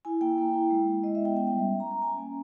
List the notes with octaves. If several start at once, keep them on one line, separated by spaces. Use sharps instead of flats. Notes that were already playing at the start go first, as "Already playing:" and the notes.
E4 G#5
A#3 G5
A#3
E4
G#3
E4
G#3 D#5
E5
B3
G5
C#4 G5
G5
G3
E5
C#4
A#5
C#4
A#5
C#4 G#5
A#3